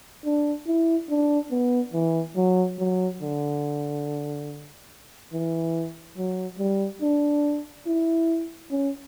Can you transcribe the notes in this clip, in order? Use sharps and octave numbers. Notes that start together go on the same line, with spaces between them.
D4
E4
D4
B3
E3
F#3
F#3
D3
E3
F#3
G3
D4
E4
C#4